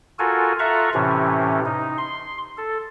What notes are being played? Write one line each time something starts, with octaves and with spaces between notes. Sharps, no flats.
F4 F#4 A4 A#4 G#5
F4 A4 E5 F#5 A#5 C#6
A2 C3 E3 C#4
D#4
C6
A4